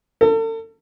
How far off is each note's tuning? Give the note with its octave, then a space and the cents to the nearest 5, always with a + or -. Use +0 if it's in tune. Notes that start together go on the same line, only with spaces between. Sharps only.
A4 +40